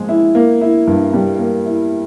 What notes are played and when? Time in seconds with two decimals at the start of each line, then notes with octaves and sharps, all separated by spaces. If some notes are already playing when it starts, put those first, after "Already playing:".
Already playing: A#2 F3 G#3
0.09 E4
0.35 A#3
0.61 E4
0.87 G2
1.13 G3
1.39 A#3
1.66 E4